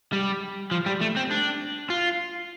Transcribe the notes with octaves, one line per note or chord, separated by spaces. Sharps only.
G3
F3
G3
A3
C4
D4
F4